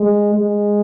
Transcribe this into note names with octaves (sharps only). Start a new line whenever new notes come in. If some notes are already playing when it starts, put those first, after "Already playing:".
Already playing: G#3
G#3